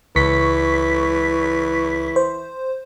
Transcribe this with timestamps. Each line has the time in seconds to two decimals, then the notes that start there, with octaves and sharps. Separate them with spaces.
0.16 C#2 E3 C#6 B6
2.16 C5